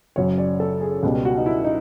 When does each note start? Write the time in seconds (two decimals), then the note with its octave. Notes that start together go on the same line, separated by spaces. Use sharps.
0.16 F#1 F#2 C#3 F#3 C#5
0.38 D5
0.60 A4
0.81 G#4
1.03 C#2 B2 G3
1.25 F#4
1.38 D#4
1.46 E4
1.64 D#4